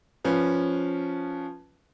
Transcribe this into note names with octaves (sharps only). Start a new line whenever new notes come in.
F3 C#4 B4